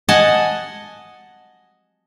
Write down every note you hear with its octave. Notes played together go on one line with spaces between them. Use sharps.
D#5 F#5 G#5 A5